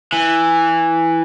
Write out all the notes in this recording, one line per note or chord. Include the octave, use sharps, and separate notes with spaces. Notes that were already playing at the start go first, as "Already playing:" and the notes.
E3